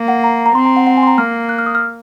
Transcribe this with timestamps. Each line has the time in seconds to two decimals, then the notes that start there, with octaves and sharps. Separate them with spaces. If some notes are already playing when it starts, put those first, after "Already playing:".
Already playing: A#3
0.08 F#5
0.24 A#5
0.46 A#5
0.55 C4 C6
0.65 A#5
0.77 F#5
0.87 F#5
0.97 G#5
1.03 C6
1.07 A#5
1.18 A#3 F6
1.49 F#6
1.59 F6
1.66 D#6
1.75 F6